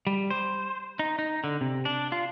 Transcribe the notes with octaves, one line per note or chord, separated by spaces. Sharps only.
G3
C5
D#4
D#4
D3
C3
D4
F4